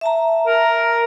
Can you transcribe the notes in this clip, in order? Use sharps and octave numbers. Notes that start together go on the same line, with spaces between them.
E5 A5 A#5
A#4